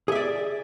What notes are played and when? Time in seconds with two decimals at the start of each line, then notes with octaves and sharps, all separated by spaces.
0.08 G#4
0.12 E5
0.15 D5